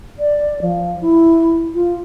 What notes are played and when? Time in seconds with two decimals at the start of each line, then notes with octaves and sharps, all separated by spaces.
0.19 D5
0.62 F3
1.02 E4
1.75 F4